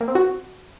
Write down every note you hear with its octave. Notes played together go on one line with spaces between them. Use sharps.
A#3
C4
F#4